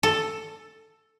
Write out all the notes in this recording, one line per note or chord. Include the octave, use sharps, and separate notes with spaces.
A4